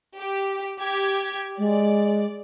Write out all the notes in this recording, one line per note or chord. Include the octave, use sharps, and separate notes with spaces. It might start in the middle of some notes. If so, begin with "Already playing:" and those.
G4
G4 G#6
G#3 D5